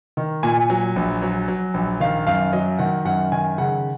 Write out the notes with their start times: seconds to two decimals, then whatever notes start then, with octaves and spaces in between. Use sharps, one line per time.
0.17 D#3
0.43 A#2 G#5
0.70 F#3
0.96 A#1
1.22 F#3
1.48 F#3
1.74 A#1
2.00 D#3 F5
2.27 F#2 F5
2.53 F#3 D#5
2.79 D#3 F#5
3.05 F#2 F#5
3.32 D#3 G#5
3.58 C#3 F#5